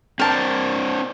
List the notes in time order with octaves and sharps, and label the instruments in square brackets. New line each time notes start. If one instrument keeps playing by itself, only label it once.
[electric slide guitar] C4 D4 C5 [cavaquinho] A#4 A5